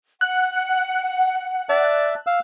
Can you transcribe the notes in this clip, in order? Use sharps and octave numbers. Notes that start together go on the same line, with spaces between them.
F#5 F#6
D5 E5 A5
F5 E6